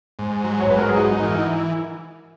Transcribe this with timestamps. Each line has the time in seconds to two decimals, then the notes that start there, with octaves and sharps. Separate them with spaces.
0.19 G#2
0.45 F#3
0.60 C#5
0.69 G#2 B4
0.78 A#4
0.88 G#4
0.96 D#4 F#4
1.22 E3 A#4